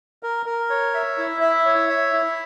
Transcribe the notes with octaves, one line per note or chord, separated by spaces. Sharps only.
A#4
A#4
C#5
E5
E4
E5
C#5
E5
E4